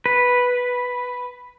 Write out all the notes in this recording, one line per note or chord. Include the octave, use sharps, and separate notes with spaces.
B4